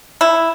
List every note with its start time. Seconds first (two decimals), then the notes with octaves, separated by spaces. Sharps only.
0.21 E4